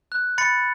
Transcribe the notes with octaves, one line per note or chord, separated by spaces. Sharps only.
F#6
B5 A6 C#7